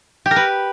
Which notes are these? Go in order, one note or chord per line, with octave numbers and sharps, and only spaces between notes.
G4
A#4
B4